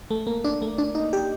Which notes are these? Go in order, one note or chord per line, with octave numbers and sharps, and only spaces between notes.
A3
A#3
D4
A3
D4
D#4
G4